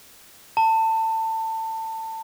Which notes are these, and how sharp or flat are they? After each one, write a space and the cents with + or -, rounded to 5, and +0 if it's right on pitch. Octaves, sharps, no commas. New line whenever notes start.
A5 +25